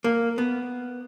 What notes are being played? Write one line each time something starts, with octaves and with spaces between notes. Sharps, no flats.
A#3
B3